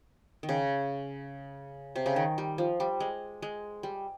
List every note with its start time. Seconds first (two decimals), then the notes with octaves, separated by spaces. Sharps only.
0.43 D#3
0.49 C#3
1.96 C3
2.06 C#3
2.16 D#3
2.38 G3
2.58 F3
2.80 G3
3.00 G#3
3.42 G#3
3.83 G3